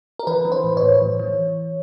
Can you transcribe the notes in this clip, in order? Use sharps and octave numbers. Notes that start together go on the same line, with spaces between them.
A#4
E3 B4
E3
C5
A2
C#5
A2
E3
E3